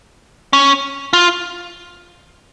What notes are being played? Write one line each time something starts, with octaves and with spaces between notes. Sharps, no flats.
C#4
F4